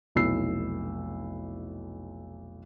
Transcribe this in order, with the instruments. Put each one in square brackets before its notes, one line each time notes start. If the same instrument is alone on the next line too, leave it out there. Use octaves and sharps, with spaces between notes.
[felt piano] F1 B1 E4 E6 C7